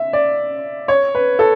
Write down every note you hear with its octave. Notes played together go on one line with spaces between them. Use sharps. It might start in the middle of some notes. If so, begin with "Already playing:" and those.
Already playing: E5
D5
C#5
B4
A4